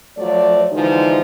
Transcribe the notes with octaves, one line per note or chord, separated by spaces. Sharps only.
F3 F#3 A3 C#5 D5
D3 E3 F3 G#3 D#4 F#4